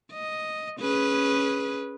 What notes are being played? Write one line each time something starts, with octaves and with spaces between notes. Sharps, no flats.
D#5
C#4 G#4 B4